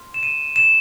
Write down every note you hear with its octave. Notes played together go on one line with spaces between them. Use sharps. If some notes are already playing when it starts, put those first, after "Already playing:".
Already playing: C6 F6
E7
D#7
E7